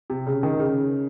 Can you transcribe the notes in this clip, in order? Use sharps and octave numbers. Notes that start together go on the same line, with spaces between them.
C3
C#3
D#3
C#3